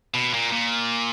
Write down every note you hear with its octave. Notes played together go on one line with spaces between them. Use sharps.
B2
A#2
A#2